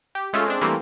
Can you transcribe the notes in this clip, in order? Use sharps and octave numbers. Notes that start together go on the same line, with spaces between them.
G4
G#3 A3 C#4 F4 A4
G#3 C4 D4
E3 G3 A3 A#3 C4